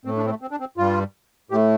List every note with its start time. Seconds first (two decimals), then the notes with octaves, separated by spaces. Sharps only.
0.05 A2 A3 C4
0.17 D4
0.26 C4
0.30 A3
0.42 C4
0.51 D4
0.60 C4
0.77 G2 G3 F4
1.50 A2 G4
1.55 A3